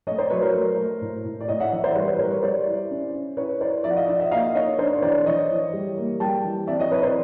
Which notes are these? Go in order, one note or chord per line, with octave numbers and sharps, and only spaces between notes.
A3 C#5 D#5
C5 D5
F#3 B4 C#5
A#4 C5
A3
A3
A2
A2
D5
A2 C#5 D#5
E5 F#5
E3 E5 F#5
C5 D5
G3 B4 C#5
B4 C#5
G3 A#4 C5
B4 C#5
G3 C5 D5
E4
C#4
C#4
E4 B4 C#5
E4 C5 D5
F3 D5 E5
F#5
D#5 F5
D#4 D5 E5
E5 F#5
A#3 D#5 F5
D#4 C#5 D#5
D4 C5 D5
C#5
E3 C5 D5
E3 C#5 D#5
E3
G3
A#3
G3 G5 A5
E3
C4 D5 E5
C#5 D#5
E3 B4 C#5
C5 D5